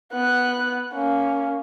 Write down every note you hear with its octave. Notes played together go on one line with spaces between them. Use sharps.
B3 F#6
A#3 C#4